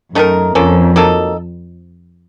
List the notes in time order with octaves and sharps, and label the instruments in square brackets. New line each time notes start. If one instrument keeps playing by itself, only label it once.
[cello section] F#2 [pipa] D#3 A3 D#4 A#4
[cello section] F2 [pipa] F3 A#3 C#4 A4
[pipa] F#3 A#3 D#4 A4